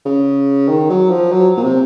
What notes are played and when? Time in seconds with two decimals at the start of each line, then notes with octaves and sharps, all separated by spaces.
0.05 C#3
0.68 D#3
0.90 F#3
1.10 F3
1.32 F#3
1.56 A#2
1.63 C3